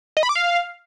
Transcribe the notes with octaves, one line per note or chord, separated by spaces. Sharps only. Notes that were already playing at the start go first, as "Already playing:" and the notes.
D#5
B5
D6
F5